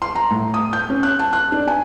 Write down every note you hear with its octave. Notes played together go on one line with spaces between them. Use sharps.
C6
A#5
A2
D#6
G6
C#4
F#6
A5
F#6
D4
G#5